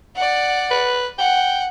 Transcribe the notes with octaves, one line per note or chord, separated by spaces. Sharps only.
D5 F#5
B4
F#5 G5